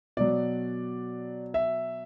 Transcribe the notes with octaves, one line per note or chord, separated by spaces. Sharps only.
B2 F#3 D5
E5